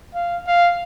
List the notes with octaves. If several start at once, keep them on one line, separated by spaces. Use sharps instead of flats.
F5
F5